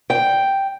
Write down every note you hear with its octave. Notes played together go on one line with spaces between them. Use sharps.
G5